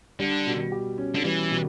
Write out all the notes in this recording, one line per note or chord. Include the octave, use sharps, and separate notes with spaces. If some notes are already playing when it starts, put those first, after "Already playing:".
D3 G3
B2
G4
C#4
D3
E3 G3
B2